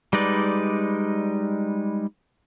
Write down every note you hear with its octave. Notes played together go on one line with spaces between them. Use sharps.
G3 G#3 D#4 B4 D5